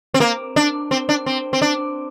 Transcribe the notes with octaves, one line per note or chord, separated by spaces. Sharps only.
C4
A#3
D4
C4
D4
C4
C4
D4